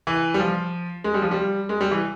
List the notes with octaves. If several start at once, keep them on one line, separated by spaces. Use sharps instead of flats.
E3
G3
F3
G#3
G3
F3
G3
G#3
G3
E3